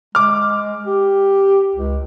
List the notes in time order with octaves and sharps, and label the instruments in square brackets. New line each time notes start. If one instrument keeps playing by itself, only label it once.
[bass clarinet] G#3 [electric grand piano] D6 F6
[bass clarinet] G4
C#2